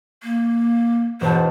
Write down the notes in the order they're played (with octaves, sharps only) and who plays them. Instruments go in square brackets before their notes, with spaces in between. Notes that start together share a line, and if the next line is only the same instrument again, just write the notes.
[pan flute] A#3
[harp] E1 A5 [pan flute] C5